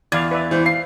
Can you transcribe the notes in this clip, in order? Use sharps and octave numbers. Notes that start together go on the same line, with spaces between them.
E2 D5 F5 G#6
B4 D5 E5
E3 C5
F5 C7